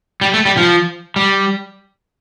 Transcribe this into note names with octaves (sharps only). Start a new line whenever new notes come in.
G3
A3
G3
F3
G3